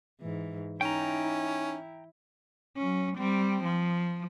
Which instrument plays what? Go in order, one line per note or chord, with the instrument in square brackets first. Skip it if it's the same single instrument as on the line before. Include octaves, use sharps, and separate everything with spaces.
[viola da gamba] G#2 E3
[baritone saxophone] C#4 [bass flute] D#4 [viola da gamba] E4 [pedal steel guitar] G5 A#5
[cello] F#3 C#4
G3 C4
F3